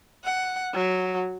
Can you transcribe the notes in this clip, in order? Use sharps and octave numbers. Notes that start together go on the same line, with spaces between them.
F#5
F#3